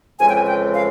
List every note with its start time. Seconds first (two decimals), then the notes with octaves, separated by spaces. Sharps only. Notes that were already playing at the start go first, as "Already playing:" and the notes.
0.20 F2 C#3 E3 G#3 G#5
0.29 G5
0.37 G#5
0.47 G5
0.75 F5